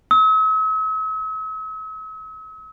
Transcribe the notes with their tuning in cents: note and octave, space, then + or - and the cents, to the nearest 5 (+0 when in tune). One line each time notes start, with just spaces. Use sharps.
E6 -45